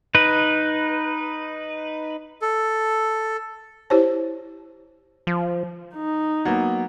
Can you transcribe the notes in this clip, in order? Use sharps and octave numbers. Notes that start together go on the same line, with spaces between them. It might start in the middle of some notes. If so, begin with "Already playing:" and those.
D#4 B4
A4
E4 G4 C5 C#5 A5
F3
D#4
F#3 A#3 B3